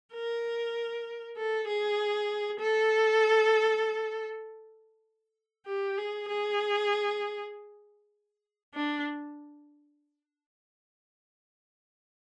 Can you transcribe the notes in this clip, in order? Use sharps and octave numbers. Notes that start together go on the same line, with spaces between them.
A#4
A4
G#4
A4
G4
G#4
G#4
D4